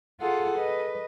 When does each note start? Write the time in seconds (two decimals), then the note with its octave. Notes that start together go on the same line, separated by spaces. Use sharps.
0.20 F4 G#4 A4 F#5
0.58 B4 D#5